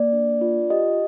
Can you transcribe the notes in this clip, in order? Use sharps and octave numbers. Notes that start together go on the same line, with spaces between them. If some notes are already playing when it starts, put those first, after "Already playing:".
Already playing: A#3 D5
D4
F4
G4 D#5